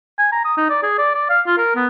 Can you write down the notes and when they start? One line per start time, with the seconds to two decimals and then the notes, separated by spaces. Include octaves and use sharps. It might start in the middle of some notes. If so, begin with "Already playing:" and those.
0.18 G#5
0.32 A#5
0.44 D#6
0.57 D#4
0.70 D5
0.83 G#4
0.98 D5
1.15 D5
1.30 F5
1.47 F4
1.58 A#4
1.76 B3